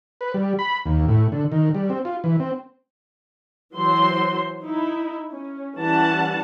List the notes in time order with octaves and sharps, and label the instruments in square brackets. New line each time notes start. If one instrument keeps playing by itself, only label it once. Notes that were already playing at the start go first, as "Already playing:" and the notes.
[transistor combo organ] B4
G3
B5
D#2
A2
D3
D#3
G3
C4
F4
E3
C4
[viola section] E3 F#3 C5 C6
D#4 E4
C#4
E3 G3 C#4 F#5 A5